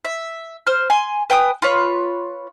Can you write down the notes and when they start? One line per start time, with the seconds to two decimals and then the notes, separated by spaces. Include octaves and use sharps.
0.05 E5
0.67 C5 F6
0.90 G#5 C6
1.30 B4 G5 G#5 D#6
1.62 F4 B4 C#5